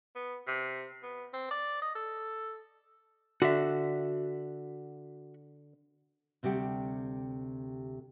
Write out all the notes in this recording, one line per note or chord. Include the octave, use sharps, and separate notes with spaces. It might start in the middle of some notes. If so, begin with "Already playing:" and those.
B3
C3
B3
C4
D5
D#5
A4
D3 F#4 E5
D2 C3 G3 G4 F#5